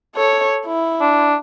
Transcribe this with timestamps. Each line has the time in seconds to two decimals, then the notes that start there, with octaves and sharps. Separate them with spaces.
0.15 A4 C#5
0.66 E4
1.01 D4